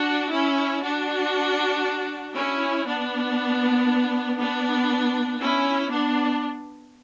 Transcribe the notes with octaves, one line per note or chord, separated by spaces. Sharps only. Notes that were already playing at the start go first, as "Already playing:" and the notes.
Already playing: D4 F#4
C#4 E4
D4 F#4
C#4 E4
B3 D4
B3 D4
C#4 E4
B3 D4